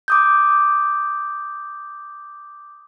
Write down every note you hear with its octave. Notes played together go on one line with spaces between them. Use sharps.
D6 D#6 G6